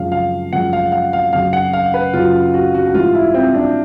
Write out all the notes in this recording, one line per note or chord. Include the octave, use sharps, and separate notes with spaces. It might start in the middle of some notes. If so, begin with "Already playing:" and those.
Already playing: F#2 C#3 F3 G#3 F5
F5
F#2 C#3 F3 G#3 F#5
F5
F5
F5
F#2 C#3 F#3 F5
F#5
F5
B4
F#2 C#3 F#3 F4
F#4
F#4
F#4
G#2 E3 G3 F4
E4
C4
D4